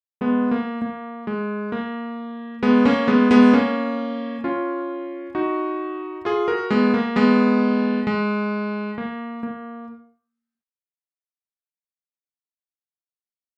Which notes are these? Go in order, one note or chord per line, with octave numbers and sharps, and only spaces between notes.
G#3 B3
A#3
A#3
G#3
A#3
G#3 B3
A#3 C#4
G#3 B3
G#3 B3
A#3 C#4
C#4 F4
D#4 F#4
F4 G#4
F#4 A#4
G#3 B3
A#3
G#3 B3
G#3
A#3
A#3